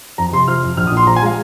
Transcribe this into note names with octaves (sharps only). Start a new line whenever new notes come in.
F2 A#5
C3 C6
F3 F6
F2
A#1 F6
D#6
A#2
C6
F3 A#5
G#5
G#3 F5